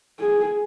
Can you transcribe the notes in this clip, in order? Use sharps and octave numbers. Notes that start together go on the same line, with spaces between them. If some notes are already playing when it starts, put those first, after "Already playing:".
G#4